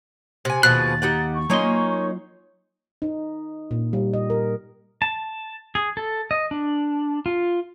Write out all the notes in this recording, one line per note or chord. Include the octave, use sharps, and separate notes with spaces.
C3 G#5
D#2 B2 F3 G#4 B5 F#6 A6
D#4 G4 F#5
C#6
F#3 A#3 C#4 D#4 F4 C6
D#4
A#2
G3
D#5
A#4
A5
G#4
A4
D#5
D4
F4